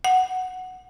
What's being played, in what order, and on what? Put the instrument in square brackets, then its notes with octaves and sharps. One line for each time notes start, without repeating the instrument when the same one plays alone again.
[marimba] F#5